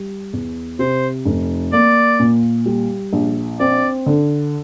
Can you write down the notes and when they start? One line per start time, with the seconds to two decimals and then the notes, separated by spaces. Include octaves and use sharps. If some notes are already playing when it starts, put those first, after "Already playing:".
Already playing: G3
0.33 E2
0.79 C3 C5
1.26 F1
1.73 A#3 D5
2.19 A#2
2.66 G3
3.13 A#1
3.60 C4 D5
4.06 D3